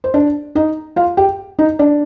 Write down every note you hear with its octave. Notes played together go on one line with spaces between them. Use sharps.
C5
D4 D5
D#4 D#5
F4 F5
G4 G5
D#4 D#5
D4 D5